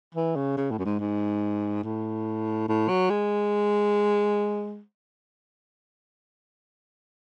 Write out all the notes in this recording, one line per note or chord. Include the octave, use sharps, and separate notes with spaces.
E3
C#3
C#3
A2
F#2
G#2
G#2
A2
A2
F#3
G#3